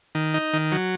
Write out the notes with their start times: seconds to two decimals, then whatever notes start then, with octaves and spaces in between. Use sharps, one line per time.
0.15 D#3
0.34 D#4
0.53 D#3
0.72 F#3